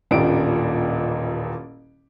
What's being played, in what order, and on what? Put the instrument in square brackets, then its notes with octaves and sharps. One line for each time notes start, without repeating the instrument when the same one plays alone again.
[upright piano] D#1 A1 A#2 D4 G4 D7